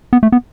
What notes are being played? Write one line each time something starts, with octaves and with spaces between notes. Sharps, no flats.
B3
A3
B3